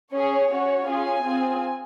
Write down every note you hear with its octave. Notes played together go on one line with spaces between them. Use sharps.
C#4 G#4 C#5
C#4 F#4
C#4 F4 G#4 G#5
C4 F4 G#4